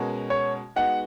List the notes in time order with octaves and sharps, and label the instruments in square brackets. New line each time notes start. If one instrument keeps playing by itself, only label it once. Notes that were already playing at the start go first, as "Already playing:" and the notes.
Already playing: [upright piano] B2 G#3 C#4 F#4 A#4
[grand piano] C#5
[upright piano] G#3 B3 D#4 F#4 [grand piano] F#5